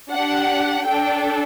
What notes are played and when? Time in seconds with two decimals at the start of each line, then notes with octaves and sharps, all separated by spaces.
0.12 D4 G4 F#5
0.87 D4 A4 G5